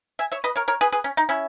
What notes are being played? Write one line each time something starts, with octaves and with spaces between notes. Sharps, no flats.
E5 G#5
C#5 E5
B4 D#5
A#4 C#5
A#4 C#5
G#4 B4
G#4 B4
C#4
D#4
C#4 E4